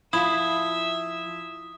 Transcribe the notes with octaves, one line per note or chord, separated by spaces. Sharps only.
F3 E4 F4 E5 D#6